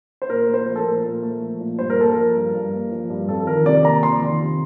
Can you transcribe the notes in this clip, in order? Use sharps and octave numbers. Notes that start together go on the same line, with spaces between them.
C5
A#2 A#4
A3
C5
F3
A4
A#4
A#2
A#2
A3
F3
A#2
G2 C5
A#4
A#3 A4
F3 A#4
G2
G2
A#3
F3
G2
F2 A4
A4
D#3 A#4
C3 D5
A#3 A#5
F2 C6
D#3
C3